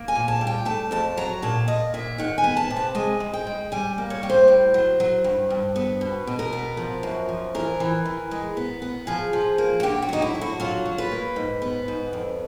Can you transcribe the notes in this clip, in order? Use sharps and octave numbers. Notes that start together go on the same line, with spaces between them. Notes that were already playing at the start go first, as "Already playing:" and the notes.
Already playing: A#3
G#5
A#2
A5
G3
G5
A3 A5
F2 A5
F#3 A#5
A#2 A5
A#2 D#5
A#2 E5
D#3 F#5
G#5
B3
A5
C3
A5
G#3 G#5
G#3
G5
G#3
G3 G#5
A#3
C#5
G3
C5
A2
F#3
F#3
G2
G2
B3
B2
B2
A#4
B3
F3
F#2
F3
E3 A#4
E3
E3
G#3
B3
B3
F3 G#4
F3
A#3
F#4
D3 G4
F#4
F#3 D#4
E4
D3
F#4
F#3 F4
F#3
B4
A#3
G#2
B3
G#2
F2